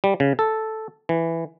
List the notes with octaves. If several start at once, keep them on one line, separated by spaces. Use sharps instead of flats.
G3
C#3
A4
E3